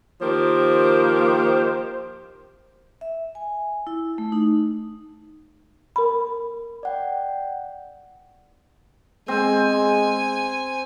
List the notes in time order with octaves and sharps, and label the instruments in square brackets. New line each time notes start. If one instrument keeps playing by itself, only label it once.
[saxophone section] D#3 F3 A#3 G4 C5
[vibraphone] E5
G#5
E4
A3
D#4
[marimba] A#4 B5
[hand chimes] D5 F#5 G5
[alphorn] G#3 [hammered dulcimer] C4 [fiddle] G#5